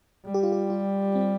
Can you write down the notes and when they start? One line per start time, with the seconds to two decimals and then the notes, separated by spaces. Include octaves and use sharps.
0.25 G3
0.34 G4
0.43 F4
0.52 G4
0.70 F4
1.15 C4